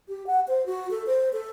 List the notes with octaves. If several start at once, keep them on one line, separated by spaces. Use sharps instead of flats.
G4
F#5
C5
F#4
A4
C5
A4